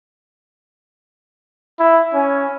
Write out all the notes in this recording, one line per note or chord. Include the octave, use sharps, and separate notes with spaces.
E4
C#4